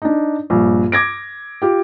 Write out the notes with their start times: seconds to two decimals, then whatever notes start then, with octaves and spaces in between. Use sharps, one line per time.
0.02 D4 D#4
0.50 A#1 G2
0.92 D6 G#6 A#6 D7
1.62 F4 G4